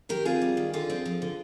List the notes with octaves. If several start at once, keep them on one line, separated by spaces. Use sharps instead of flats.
D#3 G4 A#4
C4 F4 G#4
G3
D#3
D3 F4 G#4
C4
F3
D3